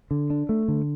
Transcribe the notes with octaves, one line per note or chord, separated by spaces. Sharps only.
D3
D4
A3
D3